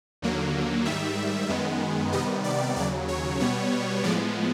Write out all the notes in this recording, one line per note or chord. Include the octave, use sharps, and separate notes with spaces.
D#2 D3 F#3 A#3
G#2 D#3 G3 E5
F#2 D#3 G#3 B3
C3 D#3 G3 B3 D#5
D5
D#2 C#3 F#3 D5
C#5
B2 G3 B3 C#5
A2 F3 G#3 B3 D5